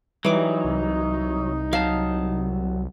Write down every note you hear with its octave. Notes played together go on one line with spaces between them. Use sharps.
E3 F#3 G3 D#4 D6
C2
F#3 F5 A5